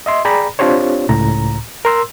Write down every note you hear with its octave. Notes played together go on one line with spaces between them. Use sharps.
D#5 E5 C6
G#4 D5 G5 A#5 B5
C4 D4 F4 G4 C5 C#5
C#2 A2 A#5
A#4 C6 E6